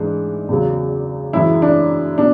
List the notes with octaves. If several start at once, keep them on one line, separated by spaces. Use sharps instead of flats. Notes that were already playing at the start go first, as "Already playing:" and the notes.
Already playing: G#2 E3 G#3 D4
E2 C#3 F#3
F#2 E3 G#3 E4
D4
B2 D4